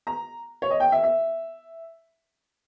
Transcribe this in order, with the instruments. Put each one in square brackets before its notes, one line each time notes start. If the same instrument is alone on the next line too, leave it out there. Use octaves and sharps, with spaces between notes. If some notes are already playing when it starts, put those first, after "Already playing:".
[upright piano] A#5
C#5
D#5
G5
E5
E5